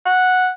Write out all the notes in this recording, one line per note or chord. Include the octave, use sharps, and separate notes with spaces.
F#5